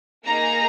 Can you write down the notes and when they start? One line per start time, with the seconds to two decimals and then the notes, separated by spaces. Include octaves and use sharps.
0.25 A#3 D#4 G#4 A#5